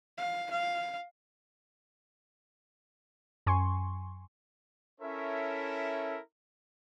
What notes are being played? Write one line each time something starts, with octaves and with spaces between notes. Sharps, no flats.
F5
F5
F#2 G#5 C6 C#6
C#4 E4 A4 A#4 C#5 E5